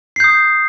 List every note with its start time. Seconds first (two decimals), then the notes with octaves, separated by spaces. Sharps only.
0.16 C7
0.20 G6
0.24 D#6